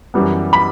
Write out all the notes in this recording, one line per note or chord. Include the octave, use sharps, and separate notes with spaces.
F#2 E3 G3 B3
B5